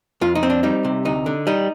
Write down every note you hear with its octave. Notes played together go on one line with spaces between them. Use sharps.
F2 F4
D#4
C4
D4
G3 D#4
C3
D2 D#4
D3
G3 D#4